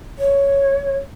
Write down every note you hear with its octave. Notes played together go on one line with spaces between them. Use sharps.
C#5